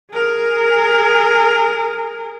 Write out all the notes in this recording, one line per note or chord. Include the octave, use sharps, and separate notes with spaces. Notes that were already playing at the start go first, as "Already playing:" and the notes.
G#4 A#4